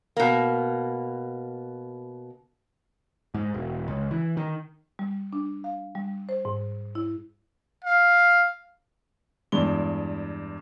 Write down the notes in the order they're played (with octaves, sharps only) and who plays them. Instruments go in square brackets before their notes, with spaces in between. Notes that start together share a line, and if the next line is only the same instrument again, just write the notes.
[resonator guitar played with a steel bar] B2 A#3
[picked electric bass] G#2
E1
C#2
E3
D#3
[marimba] G3
D4
F5
G3
C5
G#2
E4
[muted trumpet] F5
[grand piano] E2 G2 G#3 G7